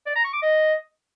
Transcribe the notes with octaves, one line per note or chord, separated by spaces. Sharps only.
D5
A#5
C#6
D6
D#5